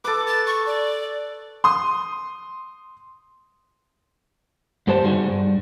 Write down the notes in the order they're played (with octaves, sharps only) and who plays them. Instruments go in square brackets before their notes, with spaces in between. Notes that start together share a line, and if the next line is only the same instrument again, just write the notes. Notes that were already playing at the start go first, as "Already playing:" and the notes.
[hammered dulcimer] A4 B4 [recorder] D6
[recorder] A6
C#6
D5
[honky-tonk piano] C6 D#6
[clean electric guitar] G2 B3 G4 C5 A5
G3 B3 D#4 F#4 G#4
G2